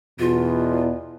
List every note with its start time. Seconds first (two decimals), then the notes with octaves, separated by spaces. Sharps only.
0.20 E2 B2 F4